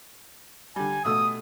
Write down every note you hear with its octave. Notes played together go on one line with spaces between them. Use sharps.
D3 G3 G#5
B2 A3 D#6 E6